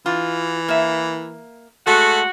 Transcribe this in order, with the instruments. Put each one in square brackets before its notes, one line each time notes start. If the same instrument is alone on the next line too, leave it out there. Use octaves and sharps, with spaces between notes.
[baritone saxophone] E3 [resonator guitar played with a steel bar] F4
[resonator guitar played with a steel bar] A#3 E5
[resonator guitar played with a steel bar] G#3 [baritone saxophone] A3 [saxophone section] F#4